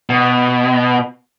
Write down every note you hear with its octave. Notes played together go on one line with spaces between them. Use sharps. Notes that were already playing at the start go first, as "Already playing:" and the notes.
B2